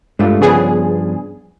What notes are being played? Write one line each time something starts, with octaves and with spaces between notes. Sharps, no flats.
G2 G#3 A3 F4
G2 C#3 F3 B3 D4 G#4